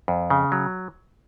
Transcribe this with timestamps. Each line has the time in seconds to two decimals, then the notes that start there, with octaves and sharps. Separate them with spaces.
0.08 F2
0.30 C#3
0.52 F#3